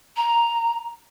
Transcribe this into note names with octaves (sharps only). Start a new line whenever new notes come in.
A#5